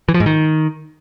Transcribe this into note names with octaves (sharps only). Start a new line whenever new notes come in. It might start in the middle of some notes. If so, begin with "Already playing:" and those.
E3
F3
G#2
D#3